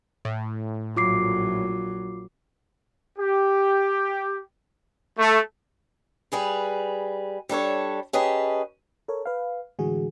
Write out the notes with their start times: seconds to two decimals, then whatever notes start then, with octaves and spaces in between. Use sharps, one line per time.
0.25 A2
0.97 A#1 F#3 F4 D6 C7
3.18 G4
5.18 A3
6.32 G3 G#4 B4
7.49 G3 D4 A4 C#5
8.13 C#4 G4 G#4 B4 D#5 A5
9.08 A4 A#4 C#5
9.26 B4 F5
9.79 A2 D3 E3 G#3 F#4 G#4